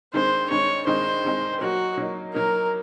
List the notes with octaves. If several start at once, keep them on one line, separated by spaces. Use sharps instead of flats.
G2 D#3 G#3 C4 D#4 C5
G2 D#3 G#3 C4 D#4 C#5
G2 D#3 G#3 C4 D#4 C5
G2 D#3 G#3 C4 D#4
F#3 A#3 D#4 F#4
F#3 A#3 D#4
F#3 A#3 D#4 A#4